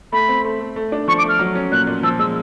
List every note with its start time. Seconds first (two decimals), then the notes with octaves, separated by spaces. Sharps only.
0.12 A3 B5
0.29 C4
0.44 A3
0.60 A3
0.76 A3
0.92 D4
1.08 F3 C#6
1.18 D6
1.24 A3 F6
1.39 F#3
1.55 C#4
1.72 A#2 F#6
1.87 A#2
2.03 F3 E6
2.19 G#3 E6